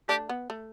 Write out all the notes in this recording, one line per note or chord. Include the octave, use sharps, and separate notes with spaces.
A3 D4 G4
B3
A3